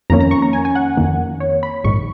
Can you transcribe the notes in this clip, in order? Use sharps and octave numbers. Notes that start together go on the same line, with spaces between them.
F2 D#3 A#3 C#4 A#5
A#5
C#6
A#5
G#5
G#5
F#5
F2 D#3 A#3
C#5
B5
A#1 G#2 D#3 C#6